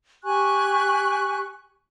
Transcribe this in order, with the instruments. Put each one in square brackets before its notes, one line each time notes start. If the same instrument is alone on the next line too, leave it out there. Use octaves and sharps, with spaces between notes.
[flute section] G4 G#5 C#6 F#6